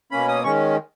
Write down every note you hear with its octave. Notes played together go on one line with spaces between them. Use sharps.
B2 A#3 C#4 B5
D#6
D#3 G#3 C#4 C#6